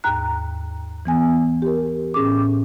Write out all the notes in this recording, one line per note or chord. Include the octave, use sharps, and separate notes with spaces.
D#2 G#2 A#5 F#6
E3 B3 G#5
G4 A#4
A2 C#4 G#4 D6